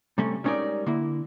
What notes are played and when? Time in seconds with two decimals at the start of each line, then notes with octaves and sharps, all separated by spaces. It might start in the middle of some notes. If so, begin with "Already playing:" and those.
0.18 C3 G3 A3 C#4
0.44 G3 G#3 C#4 D#4 A#4 D5
0.86 D3 A#3 E4